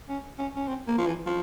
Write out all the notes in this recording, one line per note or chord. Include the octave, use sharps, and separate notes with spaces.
C#4
C#4
C#4
C4
A#3
F3
E3
F3